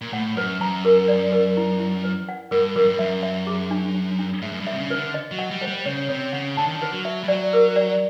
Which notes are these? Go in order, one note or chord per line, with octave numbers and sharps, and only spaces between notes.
A#2
A2 F#5
F#2 B4
F#2 A#5
A#4
D5
A#4
E4
E4
B4
F#5
G2 A#4
F#2 A#4
G2
F#2 E5
E5
G#4
D4
D4
D4
G#2 E5
F#2
G2
E5
C3
C#3
B4
D3
D#5
F#3
F#5
G3
C5
G3
C#3 C#5
C3 C#5
C#3 F#5
D3 A5
D#3
D3
B4
F#3
E5
G3
F#3 D5
A#4
D5